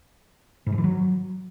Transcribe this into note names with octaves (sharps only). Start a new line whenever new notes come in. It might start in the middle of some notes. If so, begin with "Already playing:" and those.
G#2
G2
E3
F#3